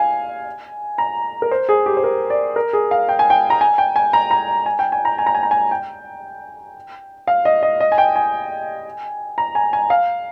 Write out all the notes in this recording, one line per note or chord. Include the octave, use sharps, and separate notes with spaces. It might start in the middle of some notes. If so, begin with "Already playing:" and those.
Already playing: F5 G#5
A#5
A#4
C5
G#4
G4
C5
A#4
D5
A#4
G#4
F5
G5
G#5
G5
A#5
G#5
G5
G#5
A#5
A#5
G#5
G5
G#5
A#5
G#5
A#5
G#5
A#5
G#5
G5
F5
D#5
D#5
D#5
G#5
G5
G#5
A#5
G#5
G#5
F5